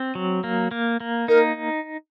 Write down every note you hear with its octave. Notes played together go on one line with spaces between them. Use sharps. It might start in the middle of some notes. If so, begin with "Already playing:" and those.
Already playing: C4
F#3
A#3
A#3
A#3
D#4 A#4